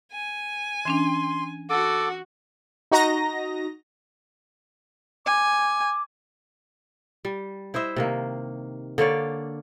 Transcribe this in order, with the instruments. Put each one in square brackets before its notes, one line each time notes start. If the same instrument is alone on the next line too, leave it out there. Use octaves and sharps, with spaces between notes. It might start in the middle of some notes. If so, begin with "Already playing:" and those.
[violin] G#5
[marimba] E3 C#4 D4 [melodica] C6
[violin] F#4 [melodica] A4 D6
[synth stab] D#4 F#4 D#5 A#5 A#6
[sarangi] G#5 [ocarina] D6
[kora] G3
E4 C5 D#5 E5
C3 D#3 A#3
D3 A#3 C#5 D5